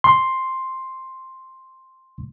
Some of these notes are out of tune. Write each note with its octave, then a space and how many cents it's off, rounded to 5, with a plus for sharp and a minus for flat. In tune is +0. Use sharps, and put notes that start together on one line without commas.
C6 +5